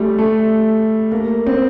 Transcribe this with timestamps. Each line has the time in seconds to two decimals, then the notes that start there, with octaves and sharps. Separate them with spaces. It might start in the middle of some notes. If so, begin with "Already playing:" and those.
Already playing: G3 A3
0.19 A3
1.12 A#3
1.47 C4